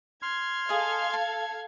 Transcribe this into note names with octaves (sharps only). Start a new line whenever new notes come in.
C6 F6 G#6
G#4 A4 D#5 F5
A5